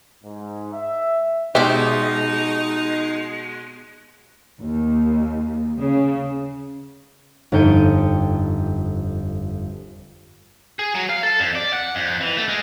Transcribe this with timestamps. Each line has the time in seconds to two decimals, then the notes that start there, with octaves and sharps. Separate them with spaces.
0.24 G#2
0.73 E5
1.55 B2 G#3 D#4 G4 C5 E5
4.59 D#2
5.79 C#3
7.52 G1 F2 D#4 G5 C#7 D#7
10.79 G#4
10.95 F#3
11.09 F5
11.23 A4
11.40 F2
11.55 D5
11.73 F#5
11.95 F2
12.21 E3
12.37 A3
12.48 G#3